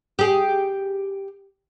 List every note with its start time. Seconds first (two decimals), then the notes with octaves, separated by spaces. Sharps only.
0.19 G4 G#4